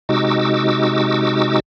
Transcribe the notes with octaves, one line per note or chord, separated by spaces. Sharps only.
C3 G#3 D#4 F#4 D6 E6